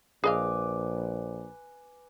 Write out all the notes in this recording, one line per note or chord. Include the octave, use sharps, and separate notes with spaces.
A#1 G#4 B4 D#5 F5 G#5 D6